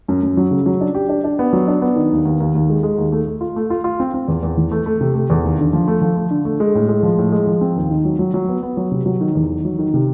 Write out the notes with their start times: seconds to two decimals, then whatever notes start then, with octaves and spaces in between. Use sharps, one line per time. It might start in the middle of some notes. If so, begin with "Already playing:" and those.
0.08 F#2
0.23 F#2
0.37 F#3
0.51 C#3
0.66 F#3
0.81 D4
0.95 G4
1.09 D4
1.24 D4
1.39 B3
1.53 F#3
1.68 D4
1.82 B3
1.96 D#3
2.12 D#2
2.25 D#2
2.40 D#2
2.55 D#2
2.69 G#3
2.83 G#3
2.98 D#2
3.12 A3
3.27 A3
3.41 F4
3.56 A3
3.70 F4
3.84 F4
4.00 C4
4.14 C4
4.28 E2
4.43 E2
4.57 E3
4.71 A3
4.86 A3
5.01 C3
5.15 A3
5.30 E2
5.44 D#2
5.58 D3
5.73 F3
5.88 A3
6.02 F3
6.17 A3
6.31 D3
6.45 A3
6.60 G#3
6.75 A2
6.89 G#3
7.03 F3
7.18 A2
7.32 G#3
7.47 F3
7.61 C4
7.76 D#2
7.90 D#3
8.05 F#3
8.19 F#3
8.34 F#3
8.48 B3
8.63 B3
8.77 F#3
8.91 C3
9.06 F#3
9.21 D#3
9.35 E2
9.50 D#3
9.65 F#3
9.78 D#3
9.94 C3